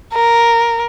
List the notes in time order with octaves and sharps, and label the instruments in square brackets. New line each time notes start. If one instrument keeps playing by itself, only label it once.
[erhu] A#4